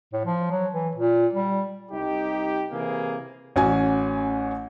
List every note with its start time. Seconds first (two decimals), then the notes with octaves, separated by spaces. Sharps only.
0.13 A2
0.25 F3
0.51 F#3
0.73 E3
0.95 A#2
1.33 G3
1.91 C2 D#4 G4
2.72 C3 E3 A#3 G#4
3.56 A1 C#4 F#4 G#5